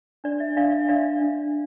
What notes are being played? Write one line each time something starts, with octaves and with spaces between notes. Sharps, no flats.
D4 D5
E5
D4 D5 F5
E5
D4 D5 F5
D4